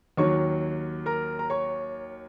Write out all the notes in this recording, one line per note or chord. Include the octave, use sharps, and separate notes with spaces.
D#2 D#3 F#3 C#5 C#6
A#4 A#5
A#5
C#5 C#6